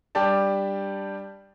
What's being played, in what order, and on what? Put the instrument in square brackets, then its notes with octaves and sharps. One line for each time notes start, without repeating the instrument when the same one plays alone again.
[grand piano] G3 D4 G4 D5 A5